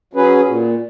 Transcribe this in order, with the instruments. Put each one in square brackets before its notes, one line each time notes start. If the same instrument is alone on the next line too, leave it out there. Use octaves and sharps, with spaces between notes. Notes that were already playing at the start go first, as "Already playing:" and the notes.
[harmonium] F#3 C#4 G#4 B4
A#2